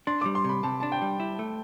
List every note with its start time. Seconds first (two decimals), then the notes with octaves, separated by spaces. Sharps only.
0.07 D4 C6
0.21 G3 D6
0.35 C6
0.44 C3 B5
0.63 C3 A5
0.80 D4 A5
0.92 G5
1.02 G3
1.20 E4
1.39 A3